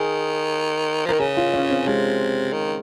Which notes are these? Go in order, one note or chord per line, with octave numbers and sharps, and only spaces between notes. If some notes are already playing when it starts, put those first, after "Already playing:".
Already playing: D#3 G#4
F3
D#3 A#4
C#3 G#4
F4
C#4
C4
C3 G#3
D#3